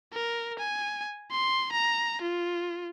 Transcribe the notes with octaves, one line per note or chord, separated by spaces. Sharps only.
A#4
G#5
C6
A#5
F4